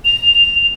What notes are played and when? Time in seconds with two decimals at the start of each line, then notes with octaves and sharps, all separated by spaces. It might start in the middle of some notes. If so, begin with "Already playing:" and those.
0.05 F7